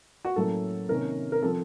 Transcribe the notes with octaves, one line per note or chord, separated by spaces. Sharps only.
F#4
A2 F#3 A#3 C#4 A4
C3 D#3 A#3 C#4 A#4
A#4
F3 C4 A4